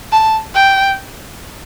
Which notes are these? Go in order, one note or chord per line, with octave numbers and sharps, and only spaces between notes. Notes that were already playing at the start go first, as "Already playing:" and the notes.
A5
G5